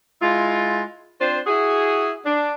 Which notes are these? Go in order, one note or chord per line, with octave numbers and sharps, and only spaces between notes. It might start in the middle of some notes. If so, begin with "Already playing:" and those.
G#3 E4 F4
C4 D4 F4 C5
E4 F#4 G#4
D4